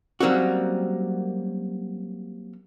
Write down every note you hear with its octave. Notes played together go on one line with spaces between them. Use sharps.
F#3 G3 A#3 C4 C#4 F#4